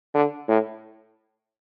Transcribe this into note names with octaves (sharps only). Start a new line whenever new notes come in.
D3
A2